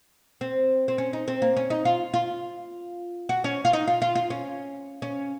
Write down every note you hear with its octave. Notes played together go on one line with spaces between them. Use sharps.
C4
C4
C#4
D#4
C4
A#3
C#4
D#4
F4
F4
F#4
C#4
F4
D#4
F4
F4
F4
C#4
C#4